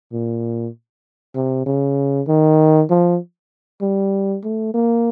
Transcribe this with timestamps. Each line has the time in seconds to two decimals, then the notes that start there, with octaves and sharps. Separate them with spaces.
0.12 A#2
1.35 C3
1.66 C#3
2.27 D#3
2.90 F3
3.81 G3
4.44 A3
4.74 A#3